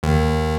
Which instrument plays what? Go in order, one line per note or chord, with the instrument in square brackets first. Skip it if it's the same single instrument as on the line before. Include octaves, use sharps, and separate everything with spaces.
[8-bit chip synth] D#2